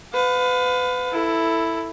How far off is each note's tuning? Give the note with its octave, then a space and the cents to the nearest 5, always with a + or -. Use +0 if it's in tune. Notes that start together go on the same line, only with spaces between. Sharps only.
B4 +30 F5 +40
E4 +0 A4 +15